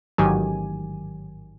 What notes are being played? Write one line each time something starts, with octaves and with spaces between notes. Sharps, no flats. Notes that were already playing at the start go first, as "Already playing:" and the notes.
A1 G#2 D#3 F#3 G4 G#5